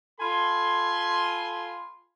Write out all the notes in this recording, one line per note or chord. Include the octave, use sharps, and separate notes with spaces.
F4 A4 G#5 B5 C6